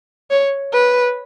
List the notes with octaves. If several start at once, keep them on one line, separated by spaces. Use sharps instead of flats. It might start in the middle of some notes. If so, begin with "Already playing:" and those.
C#5
B4